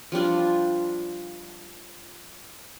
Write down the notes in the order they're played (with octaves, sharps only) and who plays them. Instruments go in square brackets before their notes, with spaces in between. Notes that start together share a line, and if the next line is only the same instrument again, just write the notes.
[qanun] F3 G3 D4 F4